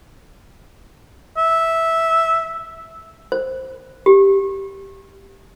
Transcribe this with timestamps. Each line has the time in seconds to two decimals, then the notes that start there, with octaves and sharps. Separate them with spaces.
1.37 E5
3.32 C5
4.06 G4